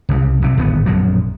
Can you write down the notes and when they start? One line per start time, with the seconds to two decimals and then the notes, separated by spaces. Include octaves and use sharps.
0.09 C2 C#3
0.42 B1 C3
0.57 D1 G#1 A3 B3
0.86 A#1 F#2 B2 F#3